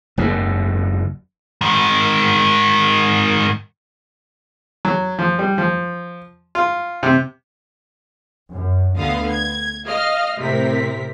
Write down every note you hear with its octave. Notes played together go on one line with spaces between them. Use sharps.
F#1 D#2 G#2
G#2 D#3
F#3
F3
G3
F3
F4
C3
F#2
D2 D3 B3 F5 D#6
G#6
D#5 F5 F6
A2 C3 C4 A#4 B6